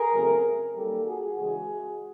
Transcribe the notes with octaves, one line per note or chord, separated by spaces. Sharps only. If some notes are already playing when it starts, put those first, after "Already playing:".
Already playing: G#4 A#4
E2 C#3 F#3 A3 C4
F#2 D#3 G3 A#3 G4 A4
F#4 G#4
C#3 E3 G#3 F#4 G#4